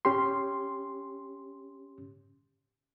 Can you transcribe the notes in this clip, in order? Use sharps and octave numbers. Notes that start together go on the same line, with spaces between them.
C#4 G4 C6